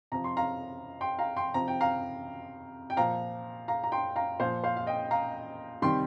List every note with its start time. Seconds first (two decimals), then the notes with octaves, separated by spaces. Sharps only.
0.12 C3 F3 A#5
0.24 C6
0.37 F5 A#5
1.01 G5 C6
1.19 F5 A#5
1.37 G5 C6
1.54 C3 F3 A#5
1.68 G5
1.81 F5 A#5
2.90 G5
2.97 A#2 F3 F5 A#5
3.68 F5 A#5
3.84 A#5
3.92 G5 C6
4.16 F5 A#5
4.40 A#2 F3 C5 F5
4.64 C5 F5
4.76 F5
4.87 D#5 G5
5.11 F5 A#5
5.82 C3 D#3 G3 G5 C6